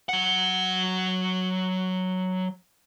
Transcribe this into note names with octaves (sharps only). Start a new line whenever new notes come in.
F#3 F#5